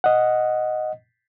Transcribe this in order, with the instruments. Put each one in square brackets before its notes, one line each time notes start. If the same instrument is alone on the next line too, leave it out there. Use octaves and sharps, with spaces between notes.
[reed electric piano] D#5 F#5